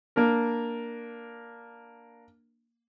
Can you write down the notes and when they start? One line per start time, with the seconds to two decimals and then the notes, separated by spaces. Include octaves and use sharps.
0.16 A#3 D4 A#4